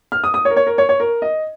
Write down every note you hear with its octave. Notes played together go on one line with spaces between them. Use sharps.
F6
D#6
D#6
C#5
A#4
C#5
A#4
C#5
C#5
A#4
D#5